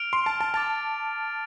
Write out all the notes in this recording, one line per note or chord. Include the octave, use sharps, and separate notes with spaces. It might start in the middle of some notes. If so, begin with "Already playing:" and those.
Already playing: F6 D7 F7
C6
A5
A5
A5 D6 A6 F7